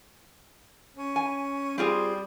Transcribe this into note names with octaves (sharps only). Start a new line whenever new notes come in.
C#4
G#5
G3 C4 F4 G#4